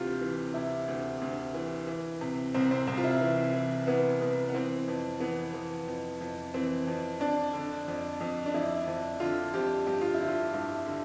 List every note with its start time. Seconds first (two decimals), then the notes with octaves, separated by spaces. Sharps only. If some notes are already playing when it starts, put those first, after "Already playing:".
Already playing: D2 C3 E3 F4 G4
0.21 E3
0.54 C3 E4
0.88 D2
1.22 D2
1.54 E3
1.87 E3
2.21 C3
2.54 C2 C4
2.71 C4
2.87 C2 C4
2.97 F4
3.04 E4
3.21 E3
3.54 E3
3.87 E3 B3
4.20 C2 B3
4.49 B3
4.54 E3 C4
4.88 F2
5.20 E3 B3
5.54 E3
5.87 F2
6.21 F2
6.54 E3 C4
6.87 F2
7.20 F2 D4
7.53 D3
7.88 F2
8.20 F2
8.46 D4
8.54 F2 E4
8.87 F2
9.20 D3 F4
9.54 F2 G4
9.86 G2 G4
10.01 F4
10.14 E4
10.20 D3
10.28 F4
10.53 G2 E4
10.86 D3